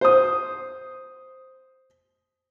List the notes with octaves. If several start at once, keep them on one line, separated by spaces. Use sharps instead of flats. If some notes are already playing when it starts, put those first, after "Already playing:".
C5 D#6